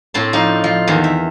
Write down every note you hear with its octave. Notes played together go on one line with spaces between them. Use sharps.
A2 C4 A4 A5 C6
F3 D#4 D5
F3
E2 D#3
E5